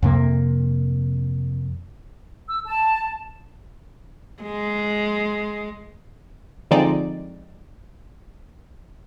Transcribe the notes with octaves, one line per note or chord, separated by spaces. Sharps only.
F2 C3 A#3
E6
A5
G#3
D3 F3 G#3 C4 D#4 D5